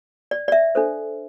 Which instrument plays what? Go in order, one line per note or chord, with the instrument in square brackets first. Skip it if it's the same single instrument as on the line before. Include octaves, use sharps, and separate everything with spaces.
[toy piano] D5
D5
E5
D4 A4 C5